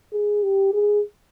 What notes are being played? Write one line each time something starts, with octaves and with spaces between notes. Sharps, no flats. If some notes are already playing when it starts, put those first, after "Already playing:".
G#4
G4
G#4